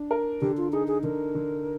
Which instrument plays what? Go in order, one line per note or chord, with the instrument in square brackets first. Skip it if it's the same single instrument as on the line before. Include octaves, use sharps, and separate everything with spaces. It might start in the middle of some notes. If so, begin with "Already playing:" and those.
Already playing: [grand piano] D4
A#4
[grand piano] D3 [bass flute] G4
[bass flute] F4
[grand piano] D#4 [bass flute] G#4
[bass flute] G#4
[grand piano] D3 [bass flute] A#4
[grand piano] D3